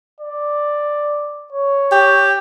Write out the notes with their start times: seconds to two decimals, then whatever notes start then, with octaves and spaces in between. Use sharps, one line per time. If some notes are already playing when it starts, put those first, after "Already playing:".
0.21 D5
1.53 C#5
1.92 G4